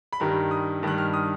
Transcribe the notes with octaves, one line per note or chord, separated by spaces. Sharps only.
B5
G2 D#3 G3 A#5
D#6
G2 D#3 G3 F#6
F6
D#6